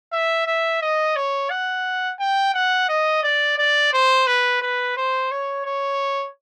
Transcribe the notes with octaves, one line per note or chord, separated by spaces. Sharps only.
E5
E5
D#5
C#5
F#5
G5
F#5
D#5
D5
D5
C5
B4
B4
C5
C#5
C#5